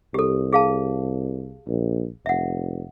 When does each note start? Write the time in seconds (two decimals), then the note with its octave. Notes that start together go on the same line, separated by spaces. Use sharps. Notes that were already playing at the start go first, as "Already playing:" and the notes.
0.14 C2 G4 A4
0.53 G#4 F5 A5
1.67 A#1
2.26 F1 E5 F#5